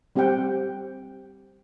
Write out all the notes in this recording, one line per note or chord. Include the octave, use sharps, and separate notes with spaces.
G3 C4 G4 F#5 G5